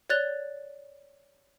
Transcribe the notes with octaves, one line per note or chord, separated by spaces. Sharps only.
C#5 D5 F#6 A6 F7 G7